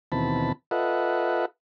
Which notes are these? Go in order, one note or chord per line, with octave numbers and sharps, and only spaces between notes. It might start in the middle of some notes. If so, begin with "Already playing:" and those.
D#2 B2 E3 C4 A5 B5
F4 A4 B4 D#5 E5 F#5